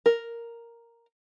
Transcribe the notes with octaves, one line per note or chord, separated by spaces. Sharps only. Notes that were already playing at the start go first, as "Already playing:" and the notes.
A#4